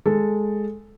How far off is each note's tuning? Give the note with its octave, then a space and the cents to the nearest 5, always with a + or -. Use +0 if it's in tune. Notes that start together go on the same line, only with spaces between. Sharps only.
G#3 +0 A4 +0